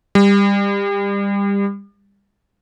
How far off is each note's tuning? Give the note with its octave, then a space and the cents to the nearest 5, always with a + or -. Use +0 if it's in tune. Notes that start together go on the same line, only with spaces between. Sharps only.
G3 +30